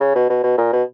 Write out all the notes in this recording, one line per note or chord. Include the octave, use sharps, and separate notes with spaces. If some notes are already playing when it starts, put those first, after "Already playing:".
C#3
B2
B2
B2
A#2
B2